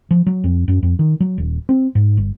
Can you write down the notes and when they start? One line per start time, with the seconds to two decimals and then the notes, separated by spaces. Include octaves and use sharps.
0.11 F3
0.27 F#3
0.44 F2
0.68 F#2
0.83 F2
0.99 D#3
1.20 F#3
1.38 D#1
1.69 C4
1.95 G#2
2.17 G1